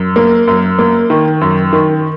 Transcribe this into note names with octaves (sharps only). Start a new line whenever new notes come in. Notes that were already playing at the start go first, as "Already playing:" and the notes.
Already playing: F#2
A#3
F#2
A#3
D#3
F#2
D#3